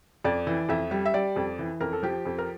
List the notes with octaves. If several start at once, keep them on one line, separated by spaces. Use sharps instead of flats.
F2 D5
E3
F2 E5
G3
E5
G3 D5
F2
E3
F2 A#4
A4
F3 G4
F2
A#4